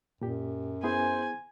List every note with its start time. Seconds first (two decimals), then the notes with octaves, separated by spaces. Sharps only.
0.21 F#2 A#2 G4
0.83 B3 E4 G#4 C5 G#5